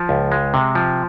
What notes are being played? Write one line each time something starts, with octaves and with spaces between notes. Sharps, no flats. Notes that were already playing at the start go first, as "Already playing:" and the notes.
Already playing: F3
C#2
G#3
C3
F3